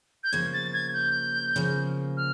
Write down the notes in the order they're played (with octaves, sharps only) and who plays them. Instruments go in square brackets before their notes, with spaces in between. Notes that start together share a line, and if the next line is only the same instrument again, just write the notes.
[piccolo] G6
[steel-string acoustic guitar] C#3 F3 A#3 [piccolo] G#6
[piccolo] A6
G#6
G6
[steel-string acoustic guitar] C#3 F3 A#3
[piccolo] F6